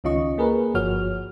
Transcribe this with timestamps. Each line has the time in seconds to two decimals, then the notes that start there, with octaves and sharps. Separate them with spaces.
0.04 C#2 D#3 C#4 F4 D#5 C#6
0.38 A#3 G#4 A#4 B4
0.74 G1 F3 F#4 C#5 F6